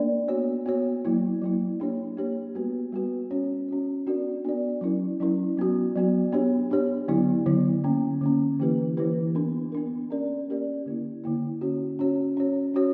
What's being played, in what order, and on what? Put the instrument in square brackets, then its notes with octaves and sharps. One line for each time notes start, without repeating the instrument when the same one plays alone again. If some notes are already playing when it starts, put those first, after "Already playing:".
Already playing: [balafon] A#3 D4 A#4 D5
B3 F#4 C#5
B3 F#4 C#5
F#3 A#3 E4
F#3 A#3 E4
A#3 D4 G4 C#5
A#3 D4 G4 C#5
G3 B3 F#4 B4
G3 B3 F#4 B4
C#4 F#4 C#5
C#4 F#4 C#5
B3 D4 F#4 A#4 D5
B3 D4 F#4 A#4 D5
F#3 C#4 E4 A#4
F#3 C#4 E4 A#4
F#3 B3 F#4
F#3 B3 F#4
B3 D4 G4 C#5
B3 D4 G4 C#5
D3 F#3 B3 E4
D3 F#3 B3 E4
D3 A#3 C#4
D3 A#3 C#4
E3 A#3 E4 G4 B4
E3 A#3 E4 G4 B4
B3 D4 A#4
B3 D4 A#4
A#3 C#4 G4 A#4 D5
A#3 C#4 G4 A#4 D5
D3 A#3 E4
D3 A#3 E4
C#4 F#4 C#5
C#4 F#4 C#5
C#4 F#4 C#5
C#4 F#4 C#5